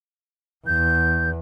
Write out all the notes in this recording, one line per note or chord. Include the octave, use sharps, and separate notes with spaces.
E2 G6